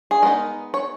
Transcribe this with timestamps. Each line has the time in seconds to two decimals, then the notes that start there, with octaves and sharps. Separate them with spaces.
0.11 G#4
0.22 G#3 B3 D#4 A#4
0.74 C#5